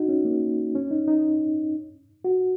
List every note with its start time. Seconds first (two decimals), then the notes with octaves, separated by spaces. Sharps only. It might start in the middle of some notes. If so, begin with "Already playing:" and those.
Already playing: D#4 F#4
0.08 C#4
0.25 A#3
0.75 C#4
0.91 D#4
1.08 D#4
2.24 F#4